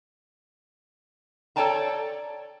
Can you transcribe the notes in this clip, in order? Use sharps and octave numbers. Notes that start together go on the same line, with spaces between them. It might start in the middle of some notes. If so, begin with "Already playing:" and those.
A4 C#5 D5 G5 A5 A#5